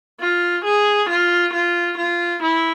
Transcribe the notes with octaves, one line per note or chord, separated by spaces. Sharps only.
F4
G#4
F4
F4
F4
E4